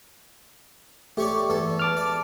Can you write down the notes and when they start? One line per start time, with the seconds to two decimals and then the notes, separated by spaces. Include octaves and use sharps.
1.17 A3 G4 C#5 D5
1.49 E2 A4
1.79 A5 D6 F6
1.97 D5